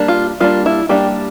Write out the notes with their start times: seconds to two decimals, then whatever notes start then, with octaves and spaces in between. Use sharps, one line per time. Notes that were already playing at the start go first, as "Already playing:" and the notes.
Already playing: G3 A#3 D4
0.08 F4
0.40 G3 A#3 D4 F4
0.66 E4
0.89 G3 A#3 D4 G4